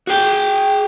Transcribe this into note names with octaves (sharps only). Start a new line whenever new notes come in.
F#4 G#4 G5